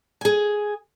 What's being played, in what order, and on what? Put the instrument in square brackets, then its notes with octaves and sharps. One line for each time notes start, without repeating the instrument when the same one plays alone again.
[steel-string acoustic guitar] G#4 G#5